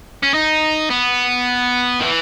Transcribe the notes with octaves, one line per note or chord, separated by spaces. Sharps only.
C#4
D#4
B3
D#3
E3